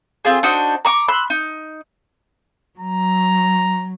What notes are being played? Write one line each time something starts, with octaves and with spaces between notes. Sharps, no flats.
C4 F4 G#4
D4 D#4 F#4 C5
A#5 C#6 D6
B5 C6 E6 F#6
D#4
F#3 A#5